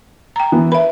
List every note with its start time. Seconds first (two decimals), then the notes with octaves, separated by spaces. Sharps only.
0.36 G5 A#5
0.52 E3 B3
0.72 B4 E5 B5